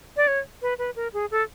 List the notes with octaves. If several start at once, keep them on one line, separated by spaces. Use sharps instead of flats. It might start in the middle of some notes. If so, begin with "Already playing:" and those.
D5
C#5
B4
B4
A#4
G#4
A4